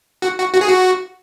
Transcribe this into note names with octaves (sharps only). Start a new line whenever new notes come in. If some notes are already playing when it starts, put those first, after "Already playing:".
F#4
F#4
F#4
G#4
F#4